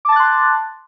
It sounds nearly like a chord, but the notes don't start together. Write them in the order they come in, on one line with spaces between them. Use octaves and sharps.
D6 A5 A6 F#6 C6